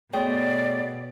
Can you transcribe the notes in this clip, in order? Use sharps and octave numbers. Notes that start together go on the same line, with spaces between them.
B2 A3 G#4 C#5 D5 G5 C6